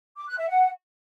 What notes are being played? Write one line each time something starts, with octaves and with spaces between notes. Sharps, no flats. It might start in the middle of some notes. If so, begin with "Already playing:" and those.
D6
F#6
E5
F#5